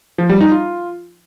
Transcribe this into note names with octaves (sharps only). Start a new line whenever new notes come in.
F3
G3
D#4
F4